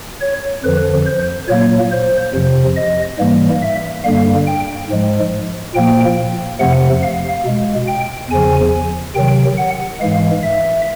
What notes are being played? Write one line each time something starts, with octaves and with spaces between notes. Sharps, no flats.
C#5
F2 D3 F3 B4
C5
A#2 F#3 A#3 C#5
C5
F2 C3 F3
D#5
G#2 E3 G3 A#3
E5
G2 D3 G3 A#3 F5
G5
G#2 F3 G#3
A#2 F3 A#3 G5
F2 C3 F3 A3 F#5
F5
B2 G#3
G5
E2 C#3 F3 G#5
C3 D#3 F#3 G5
F#5
G#2 E3 G#3 F5
E5